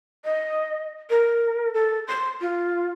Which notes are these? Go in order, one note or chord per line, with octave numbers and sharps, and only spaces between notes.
D#5
A#4
A4
C6
F4